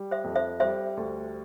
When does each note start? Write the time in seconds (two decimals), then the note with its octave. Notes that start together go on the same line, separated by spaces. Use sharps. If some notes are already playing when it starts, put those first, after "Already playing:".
Already playing: G3
0.11 C5 E5
0.24 F2
0.36 C5 E5
0.60 G3 C5 E5
0.97 D2